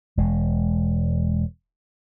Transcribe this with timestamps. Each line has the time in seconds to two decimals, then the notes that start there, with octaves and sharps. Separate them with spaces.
0.17 E1 G#3